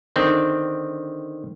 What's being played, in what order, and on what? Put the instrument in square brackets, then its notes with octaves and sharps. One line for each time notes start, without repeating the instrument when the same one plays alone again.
[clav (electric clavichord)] D3 D#3 C4